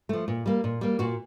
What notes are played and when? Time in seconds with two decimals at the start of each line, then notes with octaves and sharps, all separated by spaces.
0.09 F3 A3
0.28 A#2
0.46 G3 A#3
0.64 A#2
0.81 G3 A#3
0.99 A#2 F#4